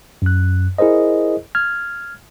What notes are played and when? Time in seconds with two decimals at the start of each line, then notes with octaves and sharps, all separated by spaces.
0.22 F#2 F#6
0.78 E4 G#4 A#4 C5 D#5
1.55 F6 G#6